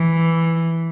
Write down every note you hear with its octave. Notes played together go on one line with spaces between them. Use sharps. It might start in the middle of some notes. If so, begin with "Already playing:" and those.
Already playing: E3